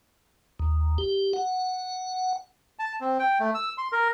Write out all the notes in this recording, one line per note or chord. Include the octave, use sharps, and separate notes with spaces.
D#2
G4
F#5
A5
C4
G5
A3
E6
C6
A#4